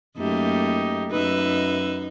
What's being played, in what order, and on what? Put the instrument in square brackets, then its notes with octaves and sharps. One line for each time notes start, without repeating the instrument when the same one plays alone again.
[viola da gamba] F#2 A3 A#3 [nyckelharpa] D#4 G4
[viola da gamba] F#2 D#4 [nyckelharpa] B4 E5